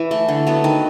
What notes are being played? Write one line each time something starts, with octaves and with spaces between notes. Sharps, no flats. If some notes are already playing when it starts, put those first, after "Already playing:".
Already playing: E3
A3
D3
F#3 B3
D#3